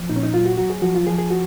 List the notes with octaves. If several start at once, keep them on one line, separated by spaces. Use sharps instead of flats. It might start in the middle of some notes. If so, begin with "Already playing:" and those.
Already playing: F3
A#2 D#4
C#4
D#4
F#3 F4
F#4
F#3 F#4
G#4
F3 F#4
F4
F3 G#4
G#4
F#4